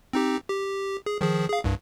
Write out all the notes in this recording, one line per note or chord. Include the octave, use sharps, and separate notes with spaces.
C4 D#4 G4
G4
G#4
D#3 F3 G#4
G#4 F5
C2 G2